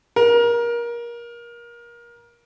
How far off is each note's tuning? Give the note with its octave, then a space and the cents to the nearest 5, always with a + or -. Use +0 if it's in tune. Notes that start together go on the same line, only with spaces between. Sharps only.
A#4 +25